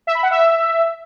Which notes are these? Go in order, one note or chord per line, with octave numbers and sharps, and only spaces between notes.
E5
B5
F#5
E5